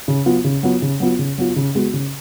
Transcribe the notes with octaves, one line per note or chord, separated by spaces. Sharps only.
C#3
F#3 B3 F4
C#3
F#3 B3 F4
C#3
F#3 B3 F4
C#3
F#3 B3 F4
C#3
G#3 B3 F#4
C#3